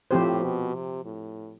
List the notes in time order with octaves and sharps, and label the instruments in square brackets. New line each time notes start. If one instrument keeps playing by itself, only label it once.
[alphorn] A2 [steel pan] F3 C4 G4 C5
[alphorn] B2
C3
A2